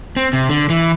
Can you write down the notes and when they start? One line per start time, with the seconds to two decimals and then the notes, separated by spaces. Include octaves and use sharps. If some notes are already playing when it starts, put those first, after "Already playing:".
0.16 C4
0.33 C3
0.49 D3
0.70 E3